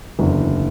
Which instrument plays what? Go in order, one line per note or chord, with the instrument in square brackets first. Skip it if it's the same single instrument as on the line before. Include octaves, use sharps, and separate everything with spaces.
[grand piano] F#1 E2 D3 F#3